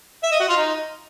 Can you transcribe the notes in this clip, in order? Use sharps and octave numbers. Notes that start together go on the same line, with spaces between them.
E5
D#5
F#4
F4
D#4